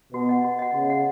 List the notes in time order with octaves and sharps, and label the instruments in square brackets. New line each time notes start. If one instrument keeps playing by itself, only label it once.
[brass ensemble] B2 [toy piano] F#4
[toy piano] D#5 F#5
F#4
D#5 F#5
[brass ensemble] C#3 [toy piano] F#4
[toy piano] D#5 F#5